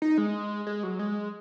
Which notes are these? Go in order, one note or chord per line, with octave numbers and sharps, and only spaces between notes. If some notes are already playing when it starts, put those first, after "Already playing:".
D#4
G#3
G#3
F#3
G#3